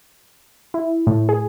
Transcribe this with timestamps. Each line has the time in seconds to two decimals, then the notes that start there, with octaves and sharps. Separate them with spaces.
0.74 E4
1.07 A2
1.29 G#4